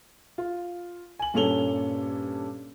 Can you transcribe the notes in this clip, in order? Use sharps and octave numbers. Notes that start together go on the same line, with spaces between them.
F4
G#5 F#7
G2 A#2 C#4 A4 F7 G7